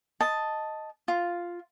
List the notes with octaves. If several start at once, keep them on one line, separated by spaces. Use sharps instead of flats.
D#5 A5
F4